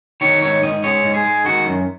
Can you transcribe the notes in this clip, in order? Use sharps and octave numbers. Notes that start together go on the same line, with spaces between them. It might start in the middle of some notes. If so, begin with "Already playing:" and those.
D#3 C#5
G#2 C#5
G#2 D#5
G#3 C#5
G#2
G#4
G#3
D#3 F#4
F#2